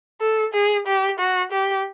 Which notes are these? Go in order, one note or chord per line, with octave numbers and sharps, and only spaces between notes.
A4
G#4
G4
F#4
G4